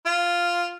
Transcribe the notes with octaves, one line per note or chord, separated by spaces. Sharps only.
F4